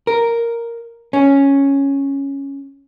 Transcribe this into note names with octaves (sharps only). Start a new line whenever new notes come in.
A#4
C#4